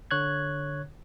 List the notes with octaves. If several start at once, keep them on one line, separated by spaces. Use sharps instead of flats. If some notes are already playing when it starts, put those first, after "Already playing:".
D3 C#5 F#6 G#6